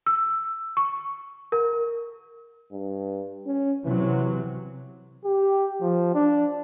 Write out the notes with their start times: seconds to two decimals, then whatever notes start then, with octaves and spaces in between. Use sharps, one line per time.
0.06 E6
0.77 C#6
1.52 A#4
2.72 G2
3.46 C#4
3.85 C3 E3 F#3
5.25 G4
5.81 F3
6.14 D4